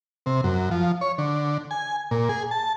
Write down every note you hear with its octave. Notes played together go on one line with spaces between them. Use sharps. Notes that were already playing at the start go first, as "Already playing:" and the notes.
C3
F#2
F3
C#5
D3
G#5
A#2
G#4
A5